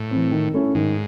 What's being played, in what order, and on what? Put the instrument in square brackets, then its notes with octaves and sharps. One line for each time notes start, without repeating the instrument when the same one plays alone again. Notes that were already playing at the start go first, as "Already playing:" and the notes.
Already playing: [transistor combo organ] A2
[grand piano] E3 C4
D#3
A3 C#4 E4
[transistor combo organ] G#2 [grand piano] D#3